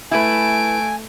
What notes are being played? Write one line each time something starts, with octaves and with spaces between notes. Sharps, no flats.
A3 E4 B4 G#5 D7